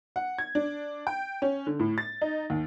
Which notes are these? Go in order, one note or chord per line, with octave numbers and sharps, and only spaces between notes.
F#5
G#6
D4
G5
C#4
D3
A2
A6
D#4
D#2